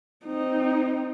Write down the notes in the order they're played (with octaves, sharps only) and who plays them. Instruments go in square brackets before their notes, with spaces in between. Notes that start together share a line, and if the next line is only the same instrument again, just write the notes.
[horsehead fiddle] C4 D#4